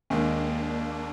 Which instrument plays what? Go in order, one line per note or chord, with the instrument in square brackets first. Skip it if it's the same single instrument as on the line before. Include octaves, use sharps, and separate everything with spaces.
[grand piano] D#2 D#3 G#3 [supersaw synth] A#3 D4